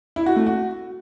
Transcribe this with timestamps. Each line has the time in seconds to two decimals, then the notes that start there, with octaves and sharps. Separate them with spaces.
0.16 E4
0.26 F#4
0.36 A3
0.46 F#4